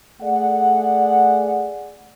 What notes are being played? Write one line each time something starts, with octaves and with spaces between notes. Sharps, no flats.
A3 G#4 D5 F#5